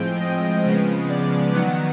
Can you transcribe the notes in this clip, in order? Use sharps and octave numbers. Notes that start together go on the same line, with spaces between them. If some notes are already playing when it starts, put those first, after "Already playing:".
Already playing: A2 F3 G#3 C4 G5
D#5
C#3 F3 G#3 B3
D5
D#3 F#3 B3 F#5